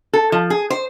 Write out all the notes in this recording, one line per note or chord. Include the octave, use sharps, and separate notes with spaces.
A4
F3
G#4
C5